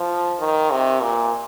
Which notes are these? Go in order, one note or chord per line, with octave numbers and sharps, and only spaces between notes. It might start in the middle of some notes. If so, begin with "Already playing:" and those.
Already playing: F3
D#3
C3
A#2